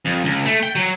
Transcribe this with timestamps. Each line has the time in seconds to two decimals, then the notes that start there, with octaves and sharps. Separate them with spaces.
0.05 F2
0.24 C#2
0.45 A3
0.63 G5
0.75 F#3